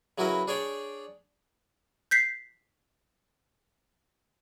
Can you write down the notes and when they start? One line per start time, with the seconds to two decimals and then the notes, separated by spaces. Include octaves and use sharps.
0.18 C#3 F#3 E4 F#4 A#4 B4
0.48 D4 G#4 C#5 D5 G5
2.11 G6 B6 C7